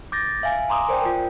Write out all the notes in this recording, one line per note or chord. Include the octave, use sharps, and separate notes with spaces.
D6 G6 A6 A#6
E5 F5 G#5
G#5 A#5 C6 D6 D#6
A#4 C5 D5 G5
F4 A#4